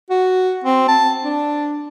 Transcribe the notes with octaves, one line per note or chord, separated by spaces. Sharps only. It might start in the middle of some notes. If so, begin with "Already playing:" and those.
F#4
C4
A5
D4